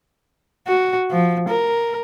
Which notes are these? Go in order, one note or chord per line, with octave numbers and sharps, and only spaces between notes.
F#4
F3
A#4